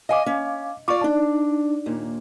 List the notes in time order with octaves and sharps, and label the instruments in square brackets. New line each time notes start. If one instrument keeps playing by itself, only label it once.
[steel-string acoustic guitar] D#5 G#5 [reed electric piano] F5 D6
[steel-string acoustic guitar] C#4
[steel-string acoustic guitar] F4 D5 [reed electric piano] C#6 D6
[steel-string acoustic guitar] D4 [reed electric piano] D#4
[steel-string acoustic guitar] D#2 A#2